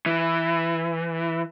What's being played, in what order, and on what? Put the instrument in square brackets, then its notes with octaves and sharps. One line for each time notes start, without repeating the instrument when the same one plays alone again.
[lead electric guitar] E3